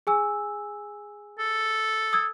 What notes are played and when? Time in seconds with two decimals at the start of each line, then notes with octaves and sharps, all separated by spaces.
0.07 G#4 G#5 E6
1.39 A4
2.13 D#6 E6 G#6